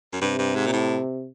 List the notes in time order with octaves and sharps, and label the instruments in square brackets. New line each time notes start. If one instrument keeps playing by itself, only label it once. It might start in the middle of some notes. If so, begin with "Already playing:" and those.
[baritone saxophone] F#2
[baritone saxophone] G2 [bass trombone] C3
[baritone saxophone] G2
G#2
A#2
A2